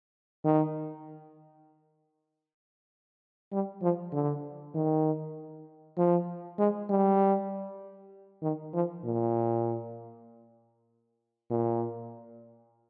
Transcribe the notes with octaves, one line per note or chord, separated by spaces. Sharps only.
D#3
G3
F3
D3
D#3
F3
G#3
G3
D#3
F3
A#2
A#2